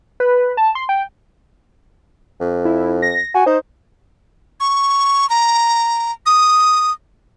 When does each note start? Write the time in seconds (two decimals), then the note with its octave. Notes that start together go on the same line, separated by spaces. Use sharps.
0.20 B4
0.57 A5
0.75 C6
0.89 G5
2.40 F2
2.65 E4
3.02 A#6
3.35 F#4 G#5
3.46 D#4 C5
4.60 C#6
5.29 A#5
6.26 D#6